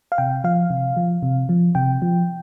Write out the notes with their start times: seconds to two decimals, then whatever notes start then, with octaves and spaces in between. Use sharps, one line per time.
0.12 F5
0.18 C3 G5
0.44 F3 F5
0.70 C3
0.97 F3
1.23 C3
1.49 F3
1.75 C3 G5
2.02 F3